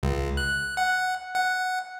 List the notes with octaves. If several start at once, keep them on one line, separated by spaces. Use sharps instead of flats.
C#2
F#6
F#5
F#5